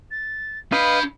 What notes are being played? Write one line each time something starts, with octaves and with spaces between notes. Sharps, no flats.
A6
D4 B4 D#5 F5 B5 G6